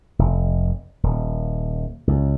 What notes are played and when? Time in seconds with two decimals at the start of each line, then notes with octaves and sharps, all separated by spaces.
0.19 F1
1.03 D#1
2.07 C#2